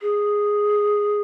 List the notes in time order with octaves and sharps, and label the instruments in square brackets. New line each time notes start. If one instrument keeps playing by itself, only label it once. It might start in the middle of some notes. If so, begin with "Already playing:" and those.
[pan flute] G#4